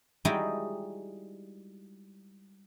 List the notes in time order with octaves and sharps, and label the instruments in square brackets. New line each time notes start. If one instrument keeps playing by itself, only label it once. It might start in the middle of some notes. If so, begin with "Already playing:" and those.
[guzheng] G3 G#3 D#4 E4 F#4 G5